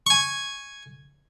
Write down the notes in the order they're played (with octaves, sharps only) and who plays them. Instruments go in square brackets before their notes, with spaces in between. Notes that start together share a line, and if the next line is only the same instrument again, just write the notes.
[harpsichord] G#5 C#6